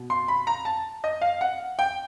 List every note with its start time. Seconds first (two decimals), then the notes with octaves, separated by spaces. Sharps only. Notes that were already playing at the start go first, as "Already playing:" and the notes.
Already playing: B2
0.10 C6
0.28 B5
0.47 A#5
0.65 A5
1.04 D#5
1.21 F5
1.41 F#5
1.79 G5